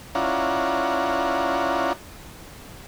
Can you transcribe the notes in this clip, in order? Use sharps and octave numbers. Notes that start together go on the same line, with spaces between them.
C#4 E4 F4 D5 F#5 A#5